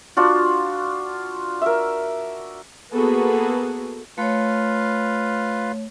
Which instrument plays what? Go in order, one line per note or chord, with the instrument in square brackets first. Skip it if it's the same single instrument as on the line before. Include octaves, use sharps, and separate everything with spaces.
[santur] D4 F4 F#4
A#4 E5
[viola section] A#3 B3 F#4 G#4 A4 B4
[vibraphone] A3 C#5 [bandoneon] F4 B4 F5